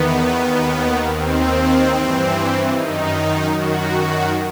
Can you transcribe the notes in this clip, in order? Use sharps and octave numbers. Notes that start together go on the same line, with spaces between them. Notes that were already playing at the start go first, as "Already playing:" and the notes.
Already playing: E2 D#3 B3
D#2 D#3
D#2 D#3 C4
G2 E3
F#2 D#3 D#4
F#2 D#3 F#4